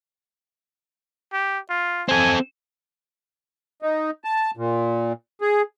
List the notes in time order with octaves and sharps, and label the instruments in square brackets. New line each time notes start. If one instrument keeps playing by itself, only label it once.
[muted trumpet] G4
F4
[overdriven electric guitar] C4 A4 [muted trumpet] G#5
[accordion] D#4
A5
A#2
G#4